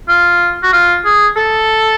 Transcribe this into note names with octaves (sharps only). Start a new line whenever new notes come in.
F4
F#4
F4
G#4
A4